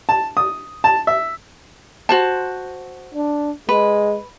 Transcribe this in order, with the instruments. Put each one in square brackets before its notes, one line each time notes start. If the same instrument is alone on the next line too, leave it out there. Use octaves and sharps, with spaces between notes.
[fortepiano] A5
D#6
A5
E5
[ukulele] F#4 C5 A5
[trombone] D4
[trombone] G#3 [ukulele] B4